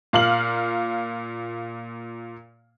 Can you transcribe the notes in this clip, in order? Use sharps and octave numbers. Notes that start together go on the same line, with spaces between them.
A#2 F5 F6 F#7